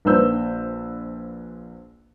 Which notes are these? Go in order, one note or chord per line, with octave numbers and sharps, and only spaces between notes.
A#1 D4 B4 C5 E6 G6